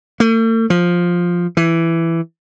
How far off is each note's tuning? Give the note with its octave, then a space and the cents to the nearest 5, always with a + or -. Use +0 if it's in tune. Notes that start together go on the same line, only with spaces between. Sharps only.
A3 +45
F3 +5
E3 +10